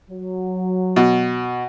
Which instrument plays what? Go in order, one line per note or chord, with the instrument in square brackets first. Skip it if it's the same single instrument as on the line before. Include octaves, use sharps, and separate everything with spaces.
[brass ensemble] F#3
[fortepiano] B2